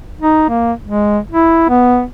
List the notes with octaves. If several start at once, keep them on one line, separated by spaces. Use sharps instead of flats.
D#4
A#3
G#3
E4
B3